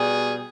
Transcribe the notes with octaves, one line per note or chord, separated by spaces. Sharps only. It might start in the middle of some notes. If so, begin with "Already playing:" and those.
Already playing: B2 G3 G#4